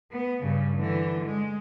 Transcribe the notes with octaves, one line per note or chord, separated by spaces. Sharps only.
B3
G2 C#3
D3 E3
G#3